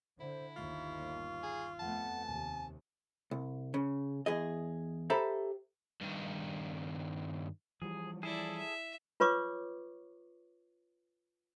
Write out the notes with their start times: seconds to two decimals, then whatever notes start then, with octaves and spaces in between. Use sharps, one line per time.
0.20 D3 E4 C5
0.57 G1 D#2 F4 C#6
1.43 G#4
1.79 F2 A3 B3 F#5 A5
2.26 D#2 C3 G#5
3.31 C2
3.74 C#3
4.26 E2 G#4 D#5
5.10 G4 A4 C5 E5 A#5 B5
6.01 G2 D#3
7.82 E3 F3 G3 G#4
8.23 E4 G#4 A4 D5
8.58 E5
9.20 F4 B4 C#5 C#6 D6